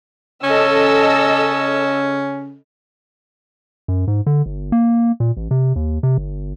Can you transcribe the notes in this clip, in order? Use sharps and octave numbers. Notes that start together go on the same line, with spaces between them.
C#3 C#4 A4 D#5 E6
F#2
G#2
D3
G1
A#3
A#2
A1
C3
D#2
C3
G1